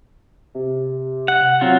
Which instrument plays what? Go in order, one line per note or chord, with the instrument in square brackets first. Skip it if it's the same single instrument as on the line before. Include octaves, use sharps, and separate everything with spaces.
[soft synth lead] C3
[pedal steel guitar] F#5
[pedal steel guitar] F#3 F4 [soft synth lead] C4